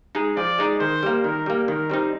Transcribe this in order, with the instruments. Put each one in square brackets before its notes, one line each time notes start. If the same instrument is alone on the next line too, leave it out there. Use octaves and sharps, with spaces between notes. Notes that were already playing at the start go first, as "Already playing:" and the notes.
[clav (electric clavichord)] G#3 D#4 G#4
[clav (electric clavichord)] F3 [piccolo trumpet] D5
[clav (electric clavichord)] G#3 D#4 G#4
[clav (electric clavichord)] D#3 [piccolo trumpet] C5
[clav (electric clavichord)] G3 A#3
[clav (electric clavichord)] D#3 [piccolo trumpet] A#4
[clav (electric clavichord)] G3 A#3
[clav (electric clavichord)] D#3 [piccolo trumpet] A#4
[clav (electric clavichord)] G3 C4 D#4